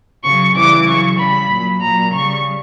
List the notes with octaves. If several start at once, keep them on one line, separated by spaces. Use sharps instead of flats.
C#3 F#3 C#6
C#3 E3 G3 D6
C#3 F#3 C#6
C#3 G3 B5
A#2 F#3
A#2 F#3 A#5
C#3 G3 C#6